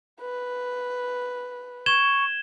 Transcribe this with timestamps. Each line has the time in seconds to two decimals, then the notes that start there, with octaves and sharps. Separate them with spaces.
0.21 B4
1.86 C#6 G#6 E7 G7